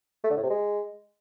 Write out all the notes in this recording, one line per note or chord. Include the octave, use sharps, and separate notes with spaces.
A3
D3
A2
C3
G#3